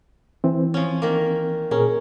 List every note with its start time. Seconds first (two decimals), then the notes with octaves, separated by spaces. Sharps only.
0.44 E3 C4
0.74 F3 C#4
1.02 D#3 A#3
1.71 A#2 C#4 G#4 A#4